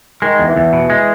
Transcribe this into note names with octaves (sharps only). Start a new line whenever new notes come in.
D#3 G#3
E2
E3
E2
B2
G#3